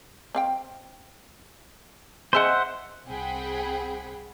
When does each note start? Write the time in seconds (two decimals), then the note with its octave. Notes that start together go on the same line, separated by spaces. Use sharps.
0.35 C4 F5 G5
2.33 C4 G#4 C5 D#5 E5 F#5
3.06 C2 C4 G#4 F#5 G5 B5